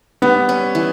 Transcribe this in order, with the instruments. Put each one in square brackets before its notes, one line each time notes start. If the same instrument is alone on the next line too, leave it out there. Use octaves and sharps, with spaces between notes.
[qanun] G3 [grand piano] B3
[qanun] C#4
E3